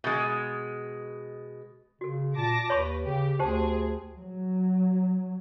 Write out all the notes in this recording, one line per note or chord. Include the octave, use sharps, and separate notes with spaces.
B2 G#3
C#3 F#4 A4
A#2 A5 D6 A#6
D#2 B4 C#5 B5 C#6
C#3 G4
D2 C4 G4 G#4 C5 A5
F#3